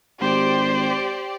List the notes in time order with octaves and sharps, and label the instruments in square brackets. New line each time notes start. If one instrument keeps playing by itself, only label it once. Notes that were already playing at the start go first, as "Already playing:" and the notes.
[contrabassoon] G#1 [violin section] G4 D5 [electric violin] C5